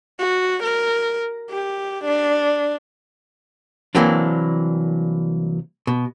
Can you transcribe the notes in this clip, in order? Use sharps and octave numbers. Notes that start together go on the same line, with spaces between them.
F#4
A#4
G4
D4
C2 E3 F#3 A#3 C4 D4
B2